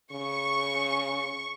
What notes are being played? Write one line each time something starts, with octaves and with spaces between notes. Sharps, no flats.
C#3 C#6